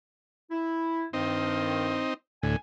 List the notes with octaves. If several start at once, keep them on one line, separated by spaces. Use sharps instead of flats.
E4
G2 D#3 C4 D#4
D2 A2 G#5